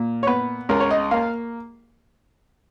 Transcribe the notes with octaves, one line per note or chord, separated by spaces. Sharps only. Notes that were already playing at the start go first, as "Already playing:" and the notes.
Already playing: A#2
C#5
B3 B4
C#2 A#4
C#5
D#5
A#3 F5